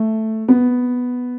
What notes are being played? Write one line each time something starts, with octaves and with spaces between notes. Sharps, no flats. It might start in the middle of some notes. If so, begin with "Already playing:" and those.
Already playing: A3
B3